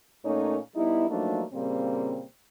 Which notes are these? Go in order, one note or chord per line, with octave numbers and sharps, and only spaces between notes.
A#2 A3 A#3 C#4 D#4 C#5
G3 B3 D#4 E4
F3 F#3 A3 A#3 D4 D#4
A#2 C#3 G3 A#3 C4